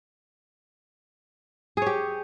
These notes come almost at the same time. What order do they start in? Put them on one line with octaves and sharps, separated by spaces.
G#4 C#5 G4